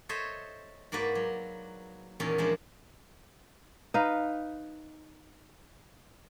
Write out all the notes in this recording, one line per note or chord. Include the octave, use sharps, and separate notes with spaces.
A4 C5 C#5 D#5 E5
G#2 A#3 F#4 B4 D5
F#3
E2 A#2 D#3 C#4 D#5
F3 G#3 A#3 D4
D#4 B4 F5